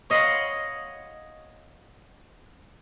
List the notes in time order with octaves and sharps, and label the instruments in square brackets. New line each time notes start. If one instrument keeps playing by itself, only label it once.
[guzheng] C#5 D#5 F5 F#5 B5 C6